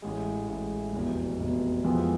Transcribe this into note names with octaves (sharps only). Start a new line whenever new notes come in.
A1 A2 G#3
A1 A2 G#3
F1 E2 B2
F1 E2 B2
F2 E3 G#3 B3 F4